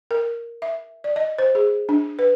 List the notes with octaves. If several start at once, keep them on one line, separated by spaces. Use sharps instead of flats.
A#4
E5
D5
D#5
C5
G#4
D4
B4